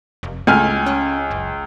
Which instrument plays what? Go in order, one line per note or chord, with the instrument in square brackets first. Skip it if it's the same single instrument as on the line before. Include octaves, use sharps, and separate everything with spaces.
[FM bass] F1
[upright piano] C#2 G#5 F6 [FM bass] A3
[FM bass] C#4
F#1